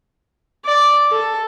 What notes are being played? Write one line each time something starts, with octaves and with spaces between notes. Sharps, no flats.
D5
A4